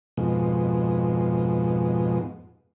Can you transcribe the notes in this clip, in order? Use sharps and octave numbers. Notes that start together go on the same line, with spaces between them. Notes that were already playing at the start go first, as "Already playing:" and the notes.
F2 G#2 B2